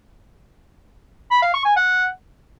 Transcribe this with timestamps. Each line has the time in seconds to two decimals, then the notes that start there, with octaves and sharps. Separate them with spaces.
1.31 B5
1.42 F5
1.54 C#6
1.65 G#5
1.77 F#5